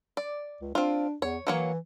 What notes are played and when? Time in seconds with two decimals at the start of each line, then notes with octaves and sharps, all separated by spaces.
0.17 D5
0.61 C#2
0.75 C4 D4 F4
1.22 E2 C#5
1.47 E3 F#3 A#3 C#5